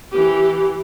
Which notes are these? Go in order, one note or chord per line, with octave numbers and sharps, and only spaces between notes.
E3 G4